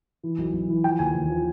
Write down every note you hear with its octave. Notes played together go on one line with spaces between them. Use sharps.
E3
B1
B1
E3
F3 G5
D#2 G#5
D#2
F3